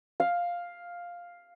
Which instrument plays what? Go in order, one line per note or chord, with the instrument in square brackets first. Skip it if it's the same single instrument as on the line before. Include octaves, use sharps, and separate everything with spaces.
[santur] F5